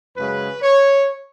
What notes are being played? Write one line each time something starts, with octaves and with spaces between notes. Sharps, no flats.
F#2 C#3 G#3 B4
C#5